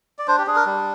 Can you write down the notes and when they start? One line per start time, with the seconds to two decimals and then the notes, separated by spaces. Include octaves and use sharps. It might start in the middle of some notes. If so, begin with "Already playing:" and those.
0.19 D5
0.28 D4 C5
0.38 G4
0.47 D4 G#4
0.56 A#4
0.66 G3